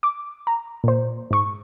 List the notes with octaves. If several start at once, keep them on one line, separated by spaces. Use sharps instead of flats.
D6
A#5
A#2 C5
G#2 C#6